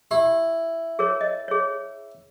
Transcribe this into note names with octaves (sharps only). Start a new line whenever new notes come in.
E4 G4
G#4 A#4 C#5
D#5
G#4 C#5